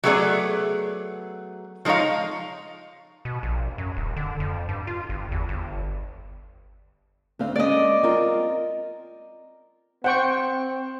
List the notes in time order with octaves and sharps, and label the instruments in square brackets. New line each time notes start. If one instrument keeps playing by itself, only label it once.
[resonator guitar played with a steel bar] F#3 G3 A3 B3 G#4 D5
F3 G#3 D#4 B4 C#5 F5
[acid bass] B2
A#1
F#2
D#1
D3
F2
G2
F4
G1
E2
G1
[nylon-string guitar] D2 C4 F5
[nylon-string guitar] G#3 A#3 C#4 [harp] D5 D#5
[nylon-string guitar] C4 F4 A#4
[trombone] C4 [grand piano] C5 [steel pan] F#5 G5 C#6